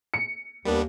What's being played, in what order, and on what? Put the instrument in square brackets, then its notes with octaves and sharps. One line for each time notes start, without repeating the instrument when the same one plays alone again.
[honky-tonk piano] C#7
[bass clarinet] D#2 [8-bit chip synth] G3 B3 D4 [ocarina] A#4